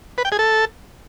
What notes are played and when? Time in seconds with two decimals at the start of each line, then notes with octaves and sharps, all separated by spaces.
0.18 B4
0.25 G5
0.32 G#4
0.39 A4